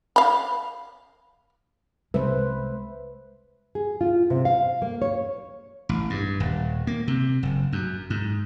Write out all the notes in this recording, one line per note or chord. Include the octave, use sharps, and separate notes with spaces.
F5 B5
C2 G#3 B4 C5 E5
G#4
F4
C3
F5
A#3
C#5
A1
G2
D#1
A#3
C3
F#1
F#2
G#2